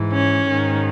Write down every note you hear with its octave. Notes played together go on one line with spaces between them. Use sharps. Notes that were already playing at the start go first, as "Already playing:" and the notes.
Already playing: G#2 E3
C#4
G#2 D#3